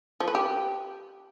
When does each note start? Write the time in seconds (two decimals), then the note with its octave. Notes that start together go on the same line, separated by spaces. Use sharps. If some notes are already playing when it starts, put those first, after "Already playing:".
0.20 F3
0.28 B4
0.35 G4